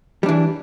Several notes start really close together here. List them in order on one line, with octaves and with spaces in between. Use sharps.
G3 D4 E3